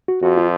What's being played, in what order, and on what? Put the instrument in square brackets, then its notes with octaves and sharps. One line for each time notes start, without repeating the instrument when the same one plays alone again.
[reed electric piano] F#4
[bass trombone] F2 [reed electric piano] F#4
[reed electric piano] F4